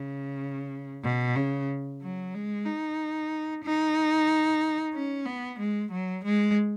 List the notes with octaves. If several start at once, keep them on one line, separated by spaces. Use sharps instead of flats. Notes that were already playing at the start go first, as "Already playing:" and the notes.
Already playing: C#3
B2
C#3
F#3
G#3
D#4
D#4
C#4
B3
G#3
F#3
G#3